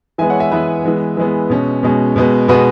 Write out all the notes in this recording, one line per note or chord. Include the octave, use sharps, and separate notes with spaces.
E3 G#3 B3 E5 G#5
C#5 F#5
E5 G#5
E3 G#3 B3 B4 E5
E3 G#3 B3
E3 G#3 B3
B2 G#3 C#4
B2 G#3 C#4
B2 G#3 B3
B2 G#3 B3 F#4 B4